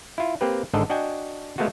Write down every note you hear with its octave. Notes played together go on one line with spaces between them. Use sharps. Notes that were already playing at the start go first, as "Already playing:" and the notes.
E4 F4
A#3 C4 G4 B4
G#1 G#2 D3 D4 A4 D#5
D4 F#4 D#5 G5 G#5
G#3 A3 B3 F4 F#4